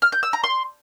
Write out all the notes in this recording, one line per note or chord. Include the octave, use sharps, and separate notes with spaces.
F6
G6
E6
A#5
C6